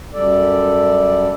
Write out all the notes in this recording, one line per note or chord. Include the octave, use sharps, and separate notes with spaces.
F#2 G3 A4 D5